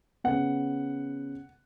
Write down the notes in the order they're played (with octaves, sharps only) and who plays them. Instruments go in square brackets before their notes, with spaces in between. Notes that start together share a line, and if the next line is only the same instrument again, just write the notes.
[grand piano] C#3 B3 F#5